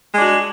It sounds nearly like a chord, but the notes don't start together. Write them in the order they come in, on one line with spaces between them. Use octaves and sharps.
G#3 D4 F#4